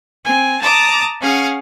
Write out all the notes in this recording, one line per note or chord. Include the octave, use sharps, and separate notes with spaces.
C4 G#5
A5 A#5 D6 D#6
C#4 G#4 F5 F#5